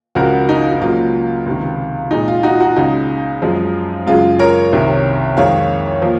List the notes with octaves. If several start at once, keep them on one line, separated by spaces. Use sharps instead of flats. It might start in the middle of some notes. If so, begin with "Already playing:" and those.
C#2 C#3 F3 F#4 A#4
D#4
D#4
C#2 C#3 F#3 A#3 F4
C#2 C3 D#3
A#2 G#3 D#4
F4
D#4 F#4
D#4 F#4
C#2 C#3 G#3 D#4
F#2 F3 G#3
F#2 C#3 G#3 F4
A#4 C#5
C2 C3 D#3
F2 D#3 G#3 C#5 F5
F3 A#3